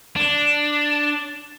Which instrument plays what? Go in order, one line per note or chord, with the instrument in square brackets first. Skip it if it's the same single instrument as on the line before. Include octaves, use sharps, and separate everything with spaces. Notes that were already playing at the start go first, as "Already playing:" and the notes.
[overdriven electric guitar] D4